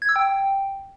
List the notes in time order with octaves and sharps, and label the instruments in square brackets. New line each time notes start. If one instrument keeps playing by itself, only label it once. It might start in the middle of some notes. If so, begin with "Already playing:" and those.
[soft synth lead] G#6
E6
G5